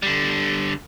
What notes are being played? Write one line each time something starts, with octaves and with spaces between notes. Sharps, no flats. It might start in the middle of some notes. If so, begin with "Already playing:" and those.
D3 G3